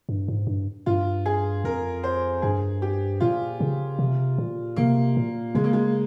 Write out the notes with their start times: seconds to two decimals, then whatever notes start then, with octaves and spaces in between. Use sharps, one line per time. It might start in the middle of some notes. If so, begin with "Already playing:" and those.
0.09 G2
0.28 G#2
0.47 G2
0.86 G2 F4
1.26 G#4
1.64 F2 A#4
2.03 C5
2.42 G2 G#4
2.82 G4
3.20 A#2 F4
3.60 C#3
3.99 C3
4.38 A#2
4.76 C3 A#3
5.17 A#2
5.55 C#3 G#3
5.64 A#3
5.73 G#3